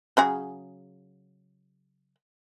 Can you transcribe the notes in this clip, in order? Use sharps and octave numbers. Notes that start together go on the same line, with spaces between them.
C#3 F#3 G#4